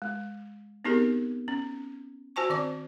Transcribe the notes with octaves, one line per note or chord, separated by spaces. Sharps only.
G#3
B3 C4 D#4 G4 G#4 A#4
C#4
F#4 C5 G#5 A5 C#6
D#3 C4 D5 D6